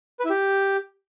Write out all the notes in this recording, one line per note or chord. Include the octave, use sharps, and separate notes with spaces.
B4
E4
G4